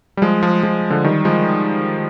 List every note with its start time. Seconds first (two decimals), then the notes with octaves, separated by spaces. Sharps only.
0.17 G3
0.22 F3 G#3
0.42 F3 G#3
0.63 F3 G#3
0.90 D3 F3
1.04 D#3 G3
1.25 F3 G#3